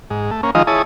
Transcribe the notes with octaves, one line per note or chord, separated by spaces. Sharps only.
G#2
A3
A#3 C#4
D#3 F3 G#3 D#4 F4 D#5
E4 G#4 C#5 A5 D#6